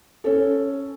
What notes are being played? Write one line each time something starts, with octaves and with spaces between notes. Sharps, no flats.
C#4 A4